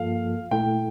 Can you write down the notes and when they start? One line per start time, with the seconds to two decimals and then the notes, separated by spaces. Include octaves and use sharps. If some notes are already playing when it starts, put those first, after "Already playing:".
Already playing: G2 F3 A#3 F4 A4 F5
0.51 A#2 A3 E4 A4 G5